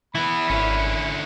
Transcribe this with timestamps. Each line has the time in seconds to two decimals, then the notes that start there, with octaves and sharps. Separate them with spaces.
0.15 E3 B3 E4 B5
0.49 G#1 D3 C#4